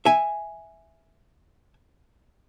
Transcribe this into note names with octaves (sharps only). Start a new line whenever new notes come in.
E5 G#5